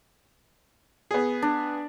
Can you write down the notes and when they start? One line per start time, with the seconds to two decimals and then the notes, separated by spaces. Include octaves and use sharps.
1.11 B3 G#4
1.42 D4